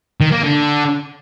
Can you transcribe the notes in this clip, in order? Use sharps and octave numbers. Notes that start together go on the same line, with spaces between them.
D#3
A#3
D3